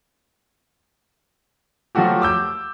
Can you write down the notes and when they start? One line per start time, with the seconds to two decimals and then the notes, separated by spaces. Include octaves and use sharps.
1.95 F3 F#3 A3 F#4 G4
2.22 D6 E6 G6